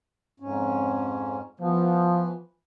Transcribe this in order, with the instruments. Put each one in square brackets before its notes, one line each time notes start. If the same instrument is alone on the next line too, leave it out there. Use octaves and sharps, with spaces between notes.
[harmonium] F2 G#2 C#4
[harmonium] E3 B3 [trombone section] F3